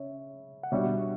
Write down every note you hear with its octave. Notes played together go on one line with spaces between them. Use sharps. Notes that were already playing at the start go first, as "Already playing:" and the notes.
Already playing: C#3 C#5 E5
F#5
B2 G3 D4 F#4 C#5 E5